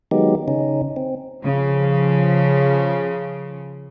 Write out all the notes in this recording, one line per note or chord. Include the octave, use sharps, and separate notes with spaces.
D#3 F#3 G#3 B3 D#4 G4
C#3 C#4 D#4
C4
C#3 F3